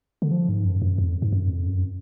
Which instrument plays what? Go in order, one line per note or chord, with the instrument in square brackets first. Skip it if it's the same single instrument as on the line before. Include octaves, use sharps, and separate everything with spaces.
[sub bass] D3
F3
G#2
F#2
F#2
F2
G#2
F#2
F2
F#2